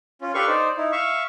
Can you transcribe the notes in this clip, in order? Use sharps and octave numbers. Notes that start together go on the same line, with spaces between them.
C#4 F4
D4 G4 A4 B4 F5 C#6
D#4 C5 D5
D#4 E4
E5 F5 C#6